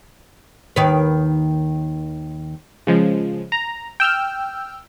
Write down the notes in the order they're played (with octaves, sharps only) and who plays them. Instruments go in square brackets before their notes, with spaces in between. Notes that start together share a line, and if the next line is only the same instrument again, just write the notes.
[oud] D#2 D#3 B4
[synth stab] C#3 F3 G#3
A#5
G5 E6 F6 G6